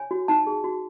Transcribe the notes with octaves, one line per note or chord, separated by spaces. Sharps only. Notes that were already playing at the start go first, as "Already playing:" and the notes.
Already playing: C#5 G#5
F#4
D#4 A5
G#4
F#4